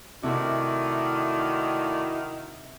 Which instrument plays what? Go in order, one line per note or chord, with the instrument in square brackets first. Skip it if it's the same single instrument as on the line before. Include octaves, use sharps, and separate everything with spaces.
[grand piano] C3 [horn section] D#3 [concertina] A3 D5 [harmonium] E4 F#4